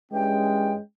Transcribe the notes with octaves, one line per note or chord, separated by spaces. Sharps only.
G2 E3 G#3 C#4 G5